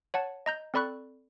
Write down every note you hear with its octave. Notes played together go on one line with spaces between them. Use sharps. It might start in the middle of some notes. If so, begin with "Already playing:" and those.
C#5 F#5 A5
D#5 A#5 G6
C4 A4 D5 B5 C#6 F#6